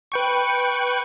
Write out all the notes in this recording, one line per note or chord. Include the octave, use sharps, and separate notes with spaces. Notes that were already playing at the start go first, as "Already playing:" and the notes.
B4 G5 C#6